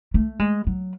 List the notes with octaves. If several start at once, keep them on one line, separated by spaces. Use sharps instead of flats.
A3
G#3
F#3